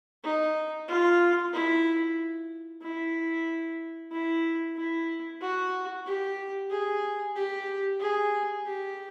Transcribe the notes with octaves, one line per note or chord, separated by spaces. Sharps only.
D#4
F4
E4
E4
E4
E4
F#4
G4
G#4
G4
G#4
G4